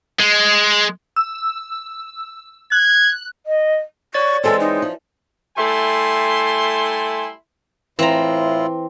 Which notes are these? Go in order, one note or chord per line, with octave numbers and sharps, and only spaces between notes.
G#3
E6
F#6 G#6
D#5
C#5 D5 C#6 A6
E3 G#3 C4 A4
D#4
F3
G3 A3 E4 G#5 C6
A2 E3 C4 E4 F4 A#5